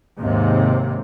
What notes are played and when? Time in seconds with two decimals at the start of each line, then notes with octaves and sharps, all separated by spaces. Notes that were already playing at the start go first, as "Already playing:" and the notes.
0.18 D#2 G#2 C3